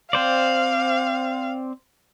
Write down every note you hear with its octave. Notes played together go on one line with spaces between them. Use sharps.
C4 C5 D5 F5